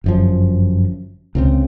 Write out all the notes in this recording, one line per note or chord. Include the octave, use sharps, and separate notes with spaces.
G1 F#2 F3
C#2 C#3 C4